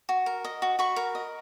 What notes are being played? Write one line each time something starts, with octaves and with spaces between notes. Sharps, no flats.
F#4
A#4
D#5
F#4
F#4 B5 C#6
A#4
D#5